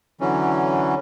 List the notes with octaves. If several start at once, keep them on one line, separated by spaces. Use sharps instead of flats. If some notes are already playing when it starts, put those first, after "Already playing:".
D3 E3 F#3 C#4